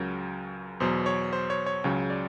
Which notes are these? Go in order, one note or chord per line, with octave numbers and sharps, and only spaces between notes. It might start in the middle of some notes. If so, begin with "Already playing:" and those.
Already playing: C#2 C#3 F#3 A#4
E2 B2 F#3 C5
C#5
C5
C#5
C#5
C#2 C#3 F#3 C#5
D5